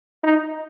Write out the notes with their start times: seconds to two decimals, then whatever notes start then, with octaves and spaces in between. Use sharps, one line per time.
0.24 D#4